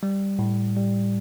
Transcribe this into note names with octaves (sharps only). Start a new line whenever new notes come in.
G3
A2
G3